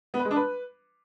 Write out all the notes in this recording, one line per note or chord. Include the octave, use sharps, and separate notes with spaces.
B3
B4
G#3
D4
B4